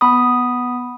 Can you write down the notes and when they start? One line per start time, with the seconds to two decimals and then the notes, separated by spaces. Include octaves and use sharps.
0.01 B3 B5 D#6